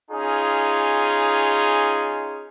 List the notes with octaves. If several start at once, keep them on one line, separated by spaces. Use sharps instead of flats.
C#4 D#4 F4 G#4